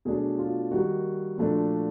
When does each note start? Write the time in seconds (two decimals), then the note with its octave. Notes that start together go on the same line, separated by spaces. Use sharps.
0.05 B2 F#3 A3 D4 G#4
0.39 F4
0.71 D#3 G3 A#3 D#4 F#4
1.38 A#2 F3 A3 D4